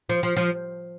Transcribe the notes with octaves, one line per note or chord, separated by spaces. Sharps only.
F3
F3
F3